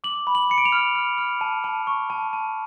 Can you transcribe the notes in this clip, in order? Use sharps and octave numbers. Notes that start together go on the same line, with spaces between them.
D6 F#7
B5
F#7
B5 C#7
D7
F7
F6
F6
F6
A5
A5
C#6
A5
A5